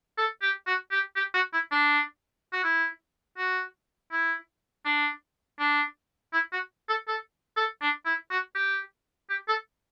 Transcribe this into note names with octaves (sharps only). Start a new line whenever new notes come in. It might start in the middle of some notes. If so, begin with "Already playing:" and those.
A4
G4
F#4
G4
G4
F#4
E4
D4
F#4
E4
F#4
E4
D4
D4
E4
F#4
A4
A4
A4
D4
E4
F#4
G4
G4
A4